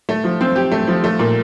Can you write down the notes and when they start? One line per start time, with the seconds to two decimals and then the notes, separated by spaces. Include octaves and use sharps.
0.09 A3
0.24 F3
0.41 C4
0.56 G4
0.71 A3
0.87 F3
1.04 A3
1.19 A#2